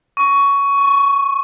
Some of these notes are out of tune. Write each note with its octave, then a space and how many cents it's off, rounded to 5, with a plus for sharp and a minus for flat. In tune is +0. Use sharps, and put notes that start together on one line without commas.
C#6 +15
C#6 -35